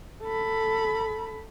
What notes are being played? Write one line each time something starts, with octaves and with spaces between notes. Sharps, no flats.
A4 B5